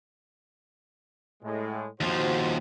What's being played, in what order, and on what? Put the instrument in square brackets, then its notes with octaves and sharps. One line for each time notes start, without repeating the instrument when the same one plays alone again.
[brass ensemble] A2 G#3
[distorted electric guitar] D#2 F3 [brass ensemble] F#4 C5